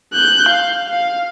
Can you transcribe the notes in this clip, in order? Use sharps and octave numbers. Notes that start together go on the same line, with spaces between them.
F#6 G6
F5
F5